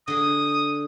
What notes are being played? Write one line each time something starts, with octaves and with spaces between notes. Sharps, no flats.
D3 G#4 D#6